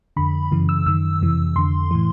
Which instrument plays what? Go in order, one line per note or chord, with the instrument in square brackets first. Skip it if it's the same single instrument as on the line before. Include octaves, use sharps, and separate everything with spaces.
[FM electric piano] F2 D3 B5
F#2 C#3 E3
E6
F#2 D#3 E6
F2 C3 E3
F2 D3 C6
A2 E3